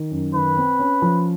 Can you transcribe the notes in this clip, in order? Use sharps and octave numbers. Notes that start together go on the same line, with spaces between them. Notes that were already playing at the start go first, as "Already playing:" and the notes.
Already playing: D#3
F#2
D#3 B4
C4
C#4
F3